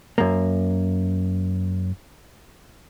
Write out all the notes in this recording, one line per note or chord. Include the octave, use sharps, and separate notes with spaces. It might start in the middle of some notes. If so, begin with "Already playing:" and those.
F#2 A#3